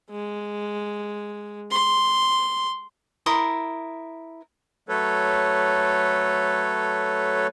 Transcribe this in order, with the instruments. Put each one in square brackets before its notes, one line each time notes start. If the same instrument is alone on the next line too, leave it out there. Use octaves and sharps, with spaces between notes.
[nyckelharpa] G#3
C6
[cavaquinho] E4 A#4 C6 D#6
[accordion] F#3 A3 A4 B4 C#5